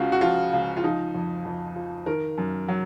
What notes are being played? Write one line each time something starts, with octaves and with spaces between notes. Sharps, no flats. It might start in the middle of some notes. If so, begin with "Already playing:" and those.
Already playing: C#2 C#3 F4 F#4
F#4
F3 F4
C#2
F4
F3 D#4
F2
F2
F3
D#3 A#4
F#2
F#3